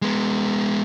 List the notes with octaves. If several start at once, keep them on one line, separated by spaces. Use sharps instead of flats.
G#3 B3